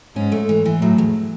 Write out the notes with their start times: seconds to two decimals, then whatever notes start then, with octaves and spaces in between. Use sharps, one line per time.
0.16 G#2 C#4
0.32 A3
0.49 E3
0.66 E3
0.81 A2 F#3
0.98 E2